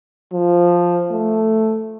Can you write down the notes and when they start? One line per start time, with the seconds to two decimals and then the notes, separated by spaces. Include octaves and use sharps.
0.33 F3
1.11 A3